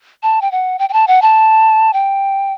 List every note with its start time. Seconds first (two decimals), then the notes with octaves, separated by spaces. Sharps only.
0.23 A5
0.42 G5
0.52 F#5
0.79 G5
0.89 G5
0.93 A5
1.07 F#5
1.22 A5
1.93 G5